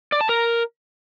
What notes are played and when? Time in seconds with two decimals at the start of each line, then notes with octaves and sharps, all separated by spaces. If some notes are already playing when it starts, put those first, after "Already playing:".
0.12 D5
0.21 A5
0.29 A#4